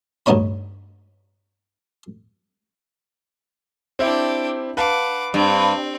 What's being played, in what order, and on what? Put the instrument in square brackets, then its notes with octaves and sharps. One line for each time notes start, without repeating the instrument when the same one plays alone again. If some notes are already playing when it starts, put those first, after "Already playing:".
[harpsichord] D2 G2 B3 D#4 C#5 B5
[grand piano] C4 E4 [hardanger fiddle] D4 G4
[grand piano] B4 F5 A5 [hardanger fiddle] F#5 D6
[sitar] G2 [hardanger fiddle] C4